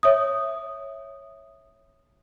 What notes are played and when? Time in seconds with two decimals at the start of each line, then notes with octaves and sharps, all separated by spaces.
0.03 C#5 E5 D#6